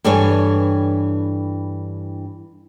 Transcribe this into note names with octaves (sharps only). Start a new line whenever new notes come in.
G2 E3 D4 A4 C#5 G#5